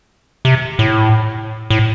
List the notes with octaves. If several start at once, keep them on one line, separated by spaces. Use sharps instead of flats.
C3
A2
A2